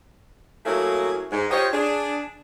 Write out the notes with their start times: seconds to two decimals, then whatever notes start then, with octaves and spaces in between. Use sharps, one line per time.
0.66 F#3 A3 A#3 C#4 E4 G#4
1.32 G#2
1.51 F4 G4 C5 C#5 D#5
1.73 D4 G#4